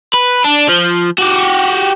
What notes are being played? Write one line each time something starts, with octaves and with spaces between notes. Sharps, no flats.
B4
D4
F3
F#4 G4